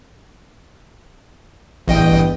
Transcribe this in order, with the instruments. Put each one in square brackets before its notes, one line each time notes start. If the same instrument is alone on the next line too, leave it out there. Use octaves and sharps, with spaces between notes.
[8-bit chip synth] A1 D#5 G5 [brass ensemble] E2 G2 B2